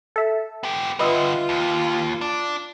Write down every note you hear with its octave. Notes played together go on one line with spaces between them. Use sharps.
A4 E5
B3 G4
D3 G3 F4 B4 D#5 E5
D#2
D4